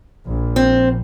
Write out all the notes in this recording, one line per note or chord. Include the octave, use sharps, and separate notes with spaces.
A#1
C4